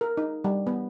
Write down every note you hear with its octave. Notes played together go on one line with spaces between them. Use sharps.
A#4
D#4
G3
B3